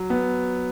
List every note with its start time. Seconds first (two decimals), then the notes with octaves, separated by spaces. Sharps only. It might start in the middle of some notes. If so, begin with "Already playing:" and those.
Already playing: F#3
0.10 B3